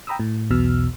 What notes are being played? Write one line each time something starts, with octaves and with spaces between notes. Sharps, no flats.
G5 A#5 B5 D#6 E6
A2
B1 E2 B2 E6 F6